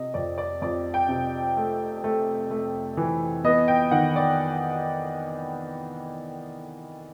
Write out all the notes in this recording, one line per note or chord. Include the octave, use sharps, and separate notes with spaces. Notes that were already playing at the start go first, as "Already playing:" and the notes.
Already playing: C3 D#5
F2 D5
D5
F2 D5
G5
C3
A3
A3
A3
E3
B3 D#5
G5
D#3 F#5
D5